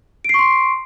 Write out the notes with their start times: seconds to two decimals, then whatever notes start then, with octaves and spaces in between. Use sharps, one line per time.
0.24 D7
0.29 C7
0.34 C#6
0.39 C6